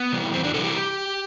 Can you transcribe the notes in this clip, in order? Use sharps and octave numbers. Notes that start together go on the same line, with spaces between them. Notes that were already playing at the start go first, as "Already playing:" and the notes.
Already playing: B3
C3 E3 G3
E2 C4
D4
C3 E3 G3 A4
G4